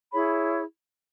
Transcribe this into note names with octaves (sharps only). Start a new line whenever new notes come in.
E4 G#4 C#5 B5